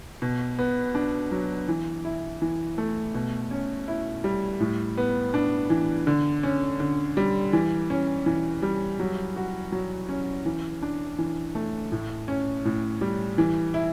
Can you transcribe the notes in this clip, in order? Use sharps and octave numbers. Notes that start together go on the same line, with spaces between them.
B2
B3
D4
F#3
E3
E4
E3
A3
B2
C#4
E4
G3
A2
B3
D4
E3
D3
C#4
D3
G3
E3
C#4
E3
G3
F#3
F#4
F#3
C#4
E3
D4
E3
A3
A2
C#4
A2
G3
E3
E4